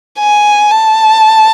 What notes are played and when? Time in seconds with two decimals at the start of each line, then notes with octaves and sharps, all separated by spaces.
0.19 G#5
0.71 A5